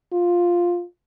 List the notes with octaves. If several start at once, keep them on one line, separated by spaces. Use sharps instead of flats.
F4